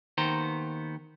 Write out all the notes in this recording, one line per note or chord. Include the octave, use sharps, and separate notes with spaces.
D#2 D#3 B3 C5 A#5